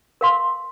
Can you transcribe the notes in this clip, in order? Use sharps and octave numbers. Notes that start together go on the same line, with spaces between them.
A#4 F5 C6